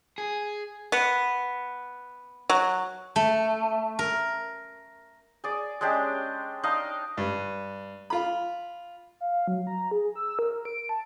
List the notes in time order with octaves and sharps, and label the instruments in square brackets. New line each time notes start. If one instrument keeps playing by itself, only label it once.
[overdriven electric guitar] G#4
[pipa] B3
F#3
[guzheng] A3
A#4
[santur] G#4 D5
G#3 C#4 D4 G4
D4 D#4 D#5 F5
[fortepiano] G2
F4 B5
[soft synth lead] F5
F#3
A#5
G#4
E6
A#4
D7
A5